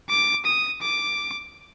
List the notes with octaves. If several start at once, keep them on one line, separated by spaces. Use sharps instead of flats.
D6
D#6
D6